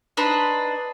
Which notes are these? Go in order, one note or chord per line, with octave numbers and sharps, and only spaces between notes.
D4 D#4 B4 C5